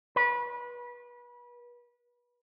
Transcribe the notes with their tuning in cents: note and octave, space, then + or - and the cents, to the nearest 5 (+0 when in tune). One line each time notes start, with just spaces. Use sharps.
B4 -30